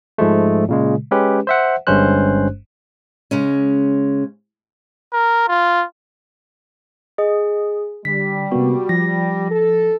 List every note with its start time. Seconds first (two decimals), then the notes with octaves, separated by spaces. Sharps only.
0.18 G#2 F3 G#3 A3
0.68 A#2 C#3 G#3
1.11 G#3 C#4 G4 B4
1.47 C5 E5 F#5
1.87 G1 G2 G#3 C#4 C5 F#6
3.31 C#3 G#3 C#4
5.13 A#4
5.48 F4
7.18 G#4 D#5
8.05 D3 G3 B6
8.52 C3 A#3 B3 F#4
8.89 F3 A#6
9.50 A4